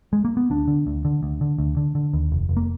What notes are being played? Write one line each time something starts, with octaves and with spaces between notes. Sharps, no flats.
G#3
A#3
B3
D2 D4
D3
D2
D3
D2
D3
D2
D3
D3
D#2
F1
F1
A#3